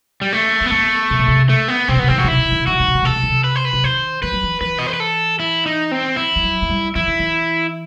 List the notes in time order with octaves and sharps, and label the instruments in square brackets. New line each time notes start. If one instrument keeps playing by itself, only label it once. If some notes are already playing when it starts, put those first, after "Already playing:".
[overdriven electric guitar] G3
A3
[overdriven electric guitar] B3 [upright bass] C4
[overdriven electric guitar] A3 [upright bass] B3
[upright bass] C3
B2
C3
[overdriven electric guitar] A3
B3
[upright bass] C3 [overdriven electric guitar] C4
[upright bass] D#3
[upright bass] C3 [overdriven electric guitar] B3
[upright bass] D#3 [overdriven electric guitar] C4
[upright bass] C3 [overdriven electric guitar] F#4
[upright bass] D#3
[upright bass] C3 [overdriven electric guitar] E4
[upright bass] D#3
C3
D#3
C3
[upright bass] D#3 [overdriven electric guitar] F#4
[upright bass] C3
D#3
C3
D#3
C3
[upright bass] D#3 [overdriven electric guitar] A4
[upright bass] C3
D#3
C3
[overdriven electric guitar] B4
C5
B4
[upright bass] C3
[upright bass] D#3 [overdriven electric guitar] C5
[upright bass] E3 [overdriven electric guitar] B4
[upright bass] F#3
E3
[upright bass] E3 [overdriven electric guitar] B4
[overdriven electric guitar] D#5
C5
B4
A4
E4
D#4
C4
E4
[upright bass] G3
F#3
A3
G3
[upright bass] E3 [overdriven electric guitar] E4
[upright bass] D#3
E3